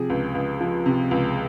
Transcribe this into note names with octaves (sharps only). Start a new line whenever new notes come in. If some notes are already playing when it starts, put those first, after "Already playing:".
Already playing: C3 F3 G#4
C#2
C#2
F3
C3
C#2